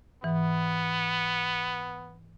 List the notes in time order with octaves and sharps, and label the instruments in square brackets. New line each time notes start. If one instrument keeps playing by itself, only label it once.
[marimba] G#2 E3 [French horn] B3